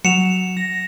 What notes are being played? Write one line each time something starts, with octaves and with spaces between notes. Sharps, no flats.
F#3 C#7 E7 F7
A#6